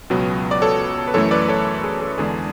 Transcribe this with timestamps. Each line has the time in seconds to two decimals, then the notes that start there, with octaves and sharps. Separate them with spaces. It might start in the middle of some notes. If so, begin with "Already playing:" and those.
0.10 C#2 B2 F#3 B3
0.51 D5
0.62 A4 C#5
1.08 B4
1.14 F#2 E3 A3 A4 C#5
1.31 B4 D5
1.49 A4 C#5
1.84 G#4
2.00 A4
2.18 E2 D3 G#3 D4 G#4